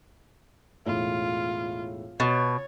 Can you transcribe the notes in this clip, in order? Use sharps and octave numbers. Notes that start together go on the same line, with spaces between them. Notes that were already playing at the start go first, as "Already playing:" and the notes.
E1 A2 F4
B2 C#5 A6